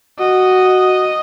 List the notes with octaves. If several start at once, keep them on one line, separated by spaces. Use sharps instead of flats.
F#4 D#5